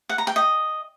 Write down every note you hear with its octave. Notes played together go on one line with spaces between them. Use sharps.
F#5
A#5
G5
D#5